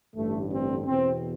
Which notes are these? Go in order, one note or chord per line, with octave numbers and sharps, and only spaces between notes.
A1 G2 D3 A3
C4
E2 B2 C4